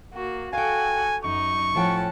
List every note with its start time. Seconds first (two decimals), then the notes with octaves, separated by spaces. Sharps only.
0.15 A#3 F#4
0.53 F#4 A4 F5 G5 G#5
1.24 F#2 F#3 D#4 C#6
1.74 A2 F3 C#4 F#5 G5 A5